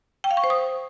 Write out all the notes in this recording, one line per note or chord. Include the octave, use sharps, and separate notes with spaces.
G5
F5
C#6
C5
D#6